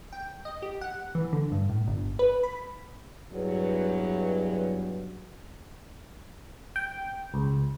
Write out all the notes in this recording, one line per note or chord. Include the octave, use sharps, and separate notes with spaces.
G5
D#5
G4
F#5
E3
D3
G2
A2
G1
B4
B5
E2 G2 F#3
G5
C#2